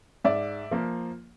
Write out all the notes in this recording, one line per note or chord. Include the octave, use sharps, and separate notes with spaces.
G#2 D5 E5
F3 A#3